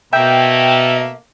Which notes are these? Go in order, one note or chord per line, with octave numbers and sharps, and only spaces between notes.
B2 A3 A#3 E5 G5